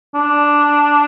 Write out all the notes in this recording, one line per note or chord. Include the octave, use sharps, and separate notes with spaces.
D4